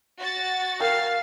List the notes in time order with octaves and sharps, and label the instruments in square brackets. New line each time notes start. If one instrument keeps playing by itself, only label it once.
[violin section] F#4 A6
[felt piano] A#4 G5 [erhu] F5